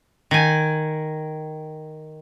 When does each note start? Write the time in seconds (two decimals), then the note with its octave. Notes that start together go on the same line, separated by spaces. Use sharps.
0.31 D#3 G#5